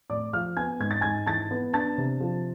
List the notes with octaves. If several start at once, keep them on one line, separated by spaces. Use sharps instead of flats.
A2 D5 D6
F3 F5 F6
B3 G#5 G#6
G#2 G#6
A6
G#2 G#5 G#6
E3 A5 A6
B3
D4 A5 A6
C3
F3